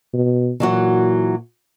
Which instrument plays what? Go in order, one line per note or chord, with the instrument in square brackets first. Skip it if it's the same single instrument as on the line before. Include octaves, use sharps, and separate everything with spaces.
[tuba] B2
[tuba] A#2 [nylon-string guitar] E3 F#3 F#4